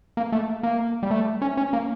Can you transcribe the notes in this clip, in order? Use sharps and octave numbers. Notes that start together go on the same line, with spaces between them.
A#3
A3
A#3
G3
A3
C#4
C#4
A#3